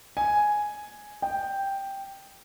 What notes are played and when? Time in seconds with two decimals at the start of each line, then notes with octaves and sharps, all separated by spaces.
0.17 G#5
1.22 G5